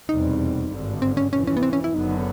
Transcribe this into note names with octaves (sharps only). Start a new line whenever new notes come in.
F1 E2 B2 G3 C4 D#4
G#1 G2 D3
C4
C#4
F2 C3 E3 C#4
C#4
B3
C4
C#4
E4
F#1 F#2 D3 F#3 B3 D#4